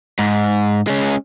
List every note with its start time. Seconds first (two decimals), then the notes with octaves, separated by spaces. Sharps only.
0.19 G#2
0.87 G#3 C#4